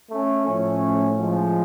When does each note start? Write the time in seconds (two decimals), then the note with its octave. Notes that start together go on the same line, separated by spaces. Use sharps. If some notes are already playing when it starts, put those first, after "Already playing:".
0.10 A3 C#4
0.46 A2 F3 A3 C#4
1.18 F3 G#3